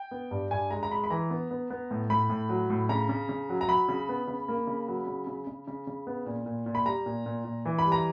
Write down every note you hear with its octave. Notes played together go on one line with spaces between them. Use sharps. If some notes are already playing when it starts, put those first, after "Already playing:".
Already playing: G5
B3
G2
G2 G#5
G#3 A#5
A#5
G#3 B5
B5
E3 A#5
B3
B3
B3
A2
A2 B5
A2
F#3
A2
C#3 A#5
C#3
C#3
F#3
A#5
F#3 B5
C#3
B3
C#3
A#3
C#3
F#3
C#3
C#3
C#3
C#3
C#3
B3
A#2
A#2
A#2
B5
G3 A#5
A#2
A#2
A#2
E3
B5
G3
A#5